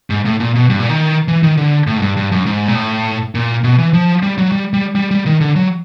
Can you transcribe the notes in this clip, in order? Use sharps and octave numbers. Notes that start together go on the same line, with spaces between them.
G#2
A2
A#2
B2
G2
A#2
D#3
E3
D#3
D3
A2
G#2
G2
G2
F#2
G#2
A#2
A2
A#2
B2
E3
F3
G3
F#3
G3
G3
G3
G3
D#3
D3
F#3